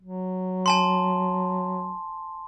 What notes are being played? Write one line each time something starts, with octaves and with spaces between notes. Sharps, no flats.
F#3
G#5 A5 C6